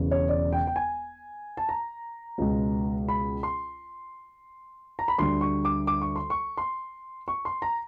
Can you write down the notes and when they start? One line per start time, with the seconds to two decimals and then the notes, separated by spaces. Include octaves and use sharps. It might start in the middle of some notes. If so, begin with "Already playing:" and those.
Already playing: E1 E2 C#3
0.11 C#5
0.29 D5
0.53 G5
0.67 G5
0.76 G#5
1.57 A5
1.69 A#5
2.38 C#2 B2 G#3
3.09 B5
3.43 C6
4.99 A#5
5.08 B5
5.18 D2 D3 G3 C6
5.41 C#6
5.65 D6
5.87 D6
6.01 C#6
6.16 C6
6.30 C#6
6.57 C6
7.28 C#6
7.45 C6
7.62 A#5